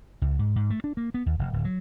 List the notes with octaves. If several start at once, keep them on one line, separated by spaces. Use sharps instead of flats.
C#2
G#2
G#2
A3
D4
A#3
B3
D#2
F1
D1
F#3